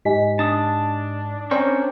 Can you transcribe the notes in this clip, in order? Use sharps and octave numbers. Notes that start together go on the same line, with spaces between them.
G#2 G4 D#5 G#5 B6
D4 A5 D#6
C4 C#4 A#4 C5 D5 C#6